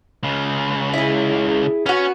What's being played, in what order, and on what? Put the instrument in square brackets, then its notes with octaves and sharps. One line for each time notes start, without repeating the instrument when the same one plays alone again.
[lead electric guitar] C#2 C#3
[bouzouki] E4 G#4
[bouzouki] B3 F#4 [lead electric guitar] C#4